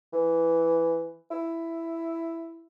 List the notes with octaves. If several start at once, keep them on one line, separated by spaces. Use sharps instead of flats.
E3
E4